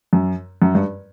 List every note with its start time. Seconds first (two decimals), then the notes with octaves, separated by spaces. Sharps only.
0.13 F#2
0.62 F#2
0.75 G2